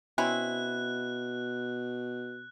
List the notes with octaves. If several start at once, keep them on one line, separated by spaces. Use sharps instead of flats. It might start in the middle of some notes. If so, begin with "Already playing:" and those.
B2 C4 C#4 E4 F#6